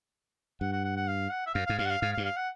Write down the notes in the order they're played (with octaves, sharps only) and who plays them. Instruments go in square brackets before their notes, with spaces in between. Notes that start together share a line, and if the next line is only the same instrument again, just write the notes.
[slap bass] G2 [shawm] F#5
[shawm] F#5
F#5
F#5
F5
F#5
E5
[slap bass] F#2 [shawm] F5
[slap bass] G#2 [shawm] F5
[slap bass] G2 [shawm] F5
[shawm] F#5
F5
[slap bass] G#2 [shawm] F5
[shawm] F5
[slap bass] G2
[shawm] F5
F#5